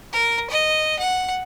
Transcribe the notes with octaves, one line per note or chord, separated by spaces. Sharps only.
A#4
D#5
F#5